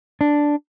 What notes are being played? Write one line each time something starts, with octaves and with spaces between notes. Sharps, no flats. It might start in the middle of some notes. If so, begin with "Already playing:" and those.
D4